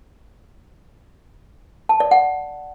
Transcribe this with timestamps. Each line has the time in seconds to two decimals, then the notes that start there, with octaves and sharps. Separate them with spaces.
1.89 A5
2.00 D5
2.11 F#5